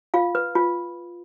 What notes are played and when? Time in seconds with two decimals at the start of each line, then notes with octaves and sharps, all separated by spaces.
0.14 F4 F5
0.35 B4
0.55 F4